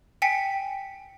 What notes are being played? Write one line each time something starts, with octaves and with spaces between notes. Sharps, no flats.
G5 G#5 B6 C#7